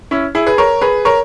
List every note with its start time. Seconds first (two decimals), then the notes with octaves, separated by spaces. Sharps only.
0.11 C#4 E4
0.35 E4 G#4
0.47 G#4 B4
0.58 A#4 C#5
0.81 G#4 B4
1.05 A#4 C#5